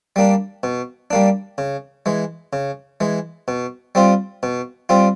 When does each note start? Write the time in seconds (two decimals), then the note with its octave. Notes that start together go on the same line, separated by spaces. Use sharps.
0.16 G3 A#3 D4
0.63 B2
1.11 G3 A#3 D4
1.58 C#3
2.06 E3 G#3
2.53 C#3
3.00 E3 G#3
3.48 B2
3.95 G3 C4 F4
4.43 B2
4.89 G3 C4 F4